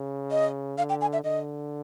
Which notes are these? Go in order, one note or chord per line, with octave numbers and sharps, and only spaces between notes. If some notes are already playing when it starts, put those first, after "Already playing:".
Already playing: C#3
D#5
D3 F5
G5
G#5
E5
D3 D#5